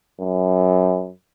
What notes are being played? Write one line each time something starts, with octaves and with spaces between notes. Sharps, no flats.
F#2